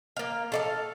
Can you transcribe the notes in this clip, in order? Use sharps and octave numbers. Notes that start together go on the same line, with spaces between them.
A#3 F5
A4 D5 F5